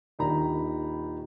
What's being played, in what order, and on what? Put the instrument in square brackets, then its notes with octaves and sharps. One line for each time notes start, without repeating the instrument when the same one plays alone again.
[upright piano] D#1 D#3 D4 A#5 B5